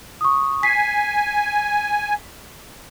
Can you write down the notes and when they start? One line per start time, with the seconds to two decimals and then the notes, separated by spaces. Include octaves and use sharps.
0.21 C#6 D#6
0.63 G#5 B6 C7